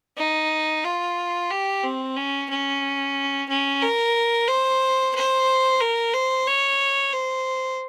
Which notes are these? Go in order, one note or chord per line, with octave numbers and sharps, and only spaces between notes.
D#4
F4
G4
C4
C#4
C#4
C#4
A#4
C5
C5
A#4
C5
C#5
C5